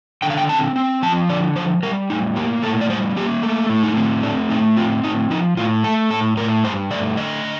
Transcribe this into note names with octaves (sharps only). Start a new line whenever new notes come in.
D3 G5
F5
G5
C4 A5
C4
F3 A5
D3 D5
F3 C5
G3 A#4
A2 D#4
A#3 G4
A2 A4
D5
G3 C5
A#3 G4
A3
A2
D#4
C4
A3 D4
A2 D#4
C4 F4
A2 D#4
F3 D#4
A2 F4
A3 A4
A2 A4
A2 A#4
G2 C5
A3 D5
D3 D#5
D3